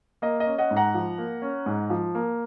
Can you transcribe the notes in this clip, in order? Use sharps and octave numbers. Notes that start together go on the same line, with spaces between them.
A#3 D#5
D#5
C#4
D#5 F#5
G#2
F#5 A#5
F3
A#3
C#4
G#2
F3
A#3